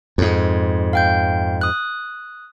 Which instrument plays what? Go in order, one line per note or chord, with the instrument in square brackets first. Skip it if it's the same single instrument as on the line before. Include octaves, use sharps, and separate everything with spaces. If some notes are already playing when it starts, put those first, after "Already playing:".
[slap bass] F2 G#2
[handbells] F5 G5 G6
D#6 F#6